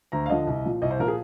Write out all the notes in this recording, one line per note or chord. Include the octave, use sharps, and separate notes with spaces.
D2 A#5
F5
D3 F3 D#5
C2
A#2 F3
C2 D#5
C5
A#2 F3 A#4
G#4